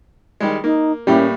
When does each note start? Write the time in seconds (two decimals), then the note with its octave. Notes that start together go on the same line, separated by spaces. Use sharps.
0.40 D#3 G3 G#3
0.64 A#3 D#4
1.07 A2 G3 A#3 C#4 E4 G4